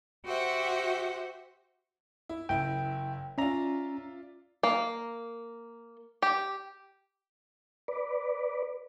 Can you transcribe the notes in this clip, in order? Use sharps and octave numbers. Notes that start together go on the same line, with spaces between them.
F#4 G4 C5 E5 F#5
E4
F#1 E4 G5
C#4 F4 D5 E5 A#5
A#3
G4
B4 D5